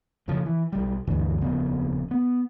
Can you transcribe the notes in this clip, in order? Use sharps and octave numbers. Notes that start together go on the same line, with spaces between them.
F2 C#3 F3
E3
B1 G3
D2 G2 D3 E3
D#1 F2 C#3 B3
B3